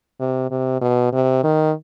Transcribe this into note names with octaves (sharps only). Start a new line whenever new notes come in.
C3
C3
B2
C3
D#3